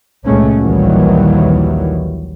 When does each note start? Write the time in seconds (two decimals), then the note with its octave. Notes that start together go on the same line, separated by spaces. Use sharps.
0.25 C#2 A#2 G#3 A3 C#4
0.59 A#1 D#2 D#3 E3 F#3 G3